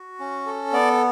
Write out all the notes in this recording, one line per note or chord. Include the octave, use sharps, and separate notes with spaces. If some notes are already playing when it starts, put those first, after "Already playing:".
Already playing: F#4
C#4
A4
B3 D5